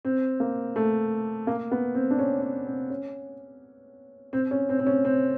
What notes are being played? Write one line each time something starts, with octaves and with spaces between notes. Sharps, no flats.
C4
A#3
A3
A#3
B3
C4
D4
C#4
C#4
C4
C#4
C4
C#4
C4
C4
C#4
C4